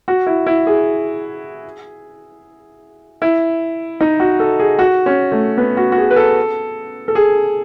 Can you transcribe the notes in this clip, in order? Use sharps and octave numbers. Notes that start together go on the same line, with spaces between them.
F#4
E4
E4
G#4
E4
D#4
F#4
A4
G#4
F#4
C#4
A3
B3
F#4
F#4
G#4
B4
A4
A4
G#4